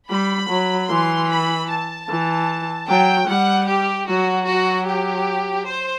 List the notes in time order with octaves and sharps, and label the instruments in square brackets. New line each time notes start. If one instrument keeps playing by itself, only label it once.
[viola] G3 [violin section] B5
[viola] F#3
[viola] E3 [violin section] C6
[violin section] B5
A5
[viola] E3
[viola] F#3 [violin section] G5
[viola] G3 [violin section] F#5
[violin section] G4
[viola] F#3 [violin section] F#4
[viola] F#3 [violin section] F#4
[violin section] G4
C5